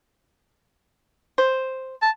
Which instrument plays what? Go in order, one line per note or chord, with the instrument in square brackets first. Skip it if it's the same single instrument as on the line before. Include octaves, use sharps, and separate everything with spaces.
[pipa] C5
[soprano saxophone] A5